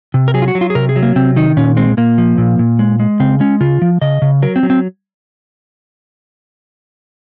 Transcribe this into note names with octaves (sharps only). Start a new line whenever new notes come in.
C3
A#4
F#3 G#4
F4
F#4
F#3
F4
G#4
C3 A#4
G#4
F#3
A#3
C3 C4
D#3 D#4
A#2 C#4
G#3 C4
A#2 A#3
F3
A#2
A#2
G#3
G#3
C#3 C4
G#3 C#4
C#3 F4
F3
C#3 D#5
C#3
F#3 A#4
C4
F#3
C4